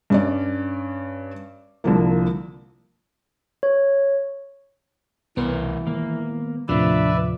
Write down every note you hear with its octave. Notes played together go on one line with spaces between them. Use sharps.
G2 C#4 D5
C2 D3 F3 A#3
C#5
C2 B2 E3 B3 A#4
D#3 G3 G#3 A#3
D#2 A2 C3 F3 D4 B4 D5 E5